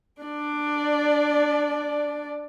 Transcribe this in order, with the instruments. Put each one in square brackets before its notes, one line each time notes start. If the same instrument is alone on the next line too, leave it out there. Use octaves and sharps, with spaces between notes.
[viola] D4 D5